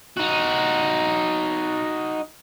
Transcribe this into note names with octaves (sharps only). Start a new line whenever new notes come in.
D#4 F#4